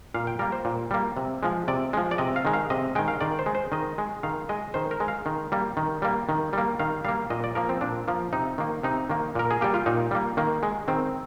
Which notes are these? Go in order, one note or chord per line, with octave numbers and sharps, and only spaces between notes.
A#2 F5
G5
G3 A#3 A#4
C5
A#2
G3 A#3
C3
F3 G#3
C3 D5
F3 G#3
D5
C3 D#5
F5
D#3 G#3
F5
C3 D#5
D#3 G#3 G5
F5
D#3 D5
C5
G#3
C5
D#3 D#5
G#3
D#3 F5
G#3 D#5
D#3 C5
A#4
G#3
F5
D#3
G3 A#3
D#3
G3 A#3
D#3
G3 A#3
D#3 F5
G3 A#3 F5
A#2 D#5
D5
F3 A#3 A#4
C4
A#2 D4
F3 A#3
C3 D#4
D#3 A#3
C3 D#4
D#3 A#3
A#2 A#4
G#4
G3 A#3 G4
F4
A#2 D#4
G3 A#3
D#3 A#3
G#3
D#3 C4